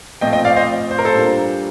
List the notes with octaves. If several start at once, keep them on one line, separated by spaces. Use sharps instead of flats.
A#2 F3 A3 C4 D#5 G5
D#5 G5
D5 F5
C5 D#5
C5
A#4
A4 C5
A#2 G3 A#3 D4